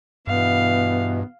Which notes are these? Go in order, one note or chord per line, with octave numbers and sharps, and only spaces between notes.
G2 B2 E3 B3 F5